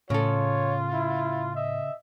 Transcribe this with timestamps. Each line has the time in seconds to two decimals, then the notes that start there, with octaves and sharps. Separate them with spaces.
0.10 A2 C#3 F4 A4 C#5
0.93 E4
1.56 D#5 E5